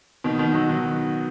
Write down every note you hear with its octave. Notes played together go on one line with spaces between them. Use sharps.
B2 D#3
B2 D#3
D#3 F#3
D#3 F#3